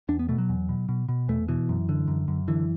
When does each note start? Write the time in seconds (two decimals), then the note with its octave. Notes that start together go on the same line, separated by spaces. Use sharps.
0.09 E2 D4
0.19 B3
0.29 B2 A3
0.38 F#3
0.49 E2
0.69 B2
0.89 B2
1.09 B2
1.28 E2 A3
1.48 B2 E3
1.69 F#2
1.89 D3
2.08 F#2
2.28 F#2
2.48 D3 E3